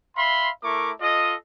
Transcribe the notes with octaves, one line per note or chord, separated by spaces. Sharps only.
E5 F5 B5 C6
A3 E4 A#4 C#6 D6
F4 A4 D#5